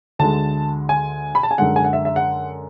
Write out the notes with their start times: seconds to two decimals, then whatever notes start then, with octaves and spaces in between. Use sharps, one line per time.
0.19 D2 D3 G#3 A5
0.89 G#5
1.35 B5
1.43 A5
1.51 G#5
1.58 F#2 D3 G#3 F#5
1.76 G#5
1.84 F#5
1.93 E5
2.05 E5
2.16 F#5